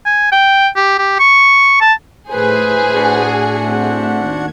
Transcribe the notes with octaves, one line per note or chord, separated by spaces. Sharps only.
G#5
G5
G4
G4
C#6
A5
A2 A3 G#4 B4 C5 E5
D4 F#4 F#5
C4
D#2 D#3 G#6